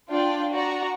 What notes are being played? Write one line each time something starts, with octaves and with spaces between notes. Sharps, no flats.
D4 F4 D5 G5
F#4 D5 A#5